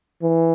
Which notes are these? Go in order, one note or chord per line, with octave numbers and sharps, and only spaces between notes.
E3